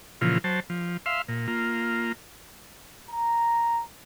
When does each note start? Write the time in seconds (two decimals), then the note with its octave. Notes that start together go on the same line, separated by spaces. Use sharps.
0.21 A#2 C#3 E3 F3 F4
0.44 F#3 C5 A5
0.70 F3
1.06 E5 F5 C6
1.28 A#2
1.48 A#3 F4
3.10 A#5